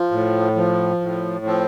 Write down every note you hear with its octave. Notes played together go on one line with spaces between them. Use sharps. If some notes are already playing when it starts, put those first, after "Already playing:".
Already playing: F3
A2
F3
A2
F3 C4